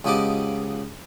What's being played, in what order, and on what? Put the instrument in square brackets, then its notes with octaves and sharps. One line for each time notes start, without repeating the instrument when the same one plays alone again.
[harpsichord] C#2 F3 B3 G4 D#5 D6